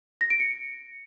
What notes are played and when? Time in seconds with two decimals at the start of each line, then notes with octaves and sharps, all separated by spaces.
0.21 A#6
0.30 D7
0.40 C#7